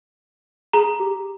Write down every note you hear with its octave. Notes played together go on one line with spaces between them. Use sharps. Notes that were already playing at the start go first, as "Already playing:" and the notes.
G#4 A#5
G4